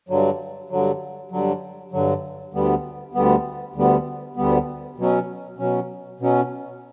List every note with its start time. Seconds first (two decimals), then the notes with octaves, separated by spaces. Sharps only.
0.09 G2 D3 F#3
0.70 G2 D3 F#3
1.31 G2 D3 F#3
1.92 G2 D3 F#3
2.54 D2 D3 G3 B3
3.14 D2 D3 G3 B3
3.75 D2 D3 G3 B3
4.37 D2 D3 G3 B3
4.98 B2 F#3 C#4
5.58 B2 F#3 C#4
6.20 B2 F#3 C#4